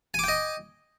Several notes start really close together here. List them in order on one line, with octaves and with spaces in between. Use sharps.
G#5 D6 G5 D#5